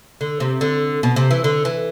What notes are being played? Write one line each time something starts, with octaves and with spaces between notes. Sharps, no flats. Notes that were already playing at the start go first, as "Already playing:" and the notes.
D3
C3
D3
B2
C3
E3
D3
E3